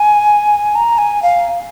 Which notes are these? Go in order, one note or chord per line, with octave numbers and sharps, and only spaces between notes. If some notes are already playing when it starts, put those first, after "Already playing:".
Already playing: G#5
A#5
G#5
F5